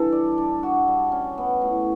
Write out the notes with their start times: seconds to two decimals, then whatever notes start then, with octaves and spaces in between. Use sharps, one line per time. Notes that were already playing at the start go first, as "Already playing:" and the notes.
Already playing: G2 E3 A4
0.12 D5
0.38 D4
0.63 F#4
0.88 G3
1.12 C#4
1.38 B3
1.62 A2